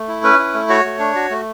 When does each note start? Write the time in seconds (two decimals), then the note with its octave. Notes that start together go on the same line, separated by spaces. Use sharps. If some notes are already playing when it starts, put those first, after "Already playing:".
Already playing: A3
0.08 E4
0.24 C#4 B4
0.39 E4
0.54 A3
0.69 F#4 C#5
0.85 A3
0.99 D4
1.15 F#4
1.30 A3